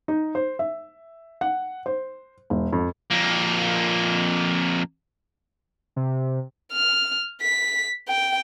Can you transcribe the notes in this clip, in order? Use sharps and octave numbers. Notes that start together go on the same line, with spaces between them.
D#4
C5
E5
F#5
C5
E1
F2
F2 A#3
C3
F6
B6
G5